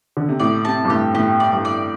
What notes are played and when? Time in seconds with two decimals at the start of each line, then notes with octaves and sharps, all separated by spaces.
0.17 D3
0.29 C3
0.40 A2 D5
0.65 C3 A5
0.85 G2
0.90 A2 G4
1.14 A2 G4
1.40 D5
1.53 G2
1.65 D5